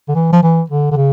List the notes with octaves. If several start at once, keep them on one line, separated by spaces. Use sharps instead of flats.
D3
E3
F3
E3
D3
D3
C#3